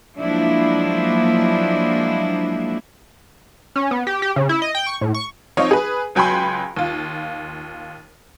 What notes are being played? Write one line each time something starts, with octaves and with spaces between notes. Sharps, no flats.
F3 F#3 G#3 A#3 D4 E4
C#4
B3
G4
G4
C#3
E4
D#5
G5
C#6
A2
C#6
F3 C4 D#4 C#5 F5
G#4 B4
C#2 F#3 G5 G#5 B5 C6
D#2 F4